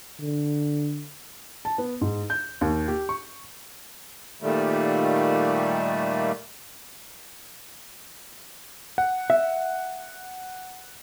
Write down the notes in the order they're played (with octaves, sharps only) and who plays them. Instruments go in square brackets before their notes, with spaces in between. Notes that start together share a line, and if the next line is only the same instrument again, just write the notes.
[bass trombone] D3
[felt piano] A5
B3
G#2
G6
D#2
G4
C#6
[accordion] A#2 D#3 G3 A3
[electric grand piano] F#5
[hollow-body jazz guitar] E5